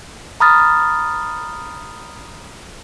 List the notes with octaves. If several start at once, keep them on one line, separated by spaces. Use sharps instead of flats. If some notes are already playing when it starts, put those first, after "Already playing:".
A#5 B5 D#6 F6 A6